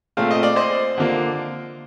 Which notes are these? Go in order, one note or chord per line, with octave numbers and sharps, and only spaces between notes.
A#2 A3 C4 F5
D#5
D5
C5 D#5
D3 F3 A#3